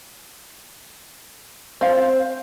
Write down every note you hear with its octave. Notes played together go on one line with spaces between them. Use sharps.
C4 C5 F5